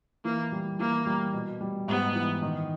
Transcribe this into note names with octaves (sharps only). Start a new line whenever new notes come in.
E3 A#3
G3
E3 A#3
G3
B2
G3
G#2 B3
E3
D#3